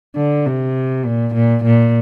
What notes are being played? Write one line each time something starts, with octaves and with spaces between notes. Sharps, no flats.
D3
C3
A#2
A#2
A#2